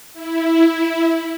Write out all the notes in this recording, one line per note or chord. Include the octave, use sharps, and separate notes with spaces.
E4